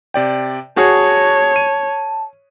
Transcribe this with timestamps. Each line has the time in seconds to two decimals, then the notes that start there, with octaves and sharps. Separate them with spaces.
0.14 C3 D5 G5
0.77 F#4 G#4 C#5 A5
1.56 D#7